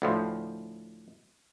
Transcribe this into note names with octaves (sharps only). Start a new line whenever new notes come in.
D2 A2 F3